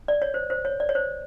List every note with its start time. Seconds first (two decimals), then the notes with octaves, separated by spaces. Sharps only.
0.08 D5
0.22 C#5
0.34 C5
0.50 C5
0.65 C#5
0.80 D5
0.89 C#5
0.95 C5